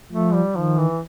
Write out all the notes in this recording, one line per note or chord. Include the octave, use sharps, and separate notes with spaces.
F3 A3
G3
D#3 F3
E3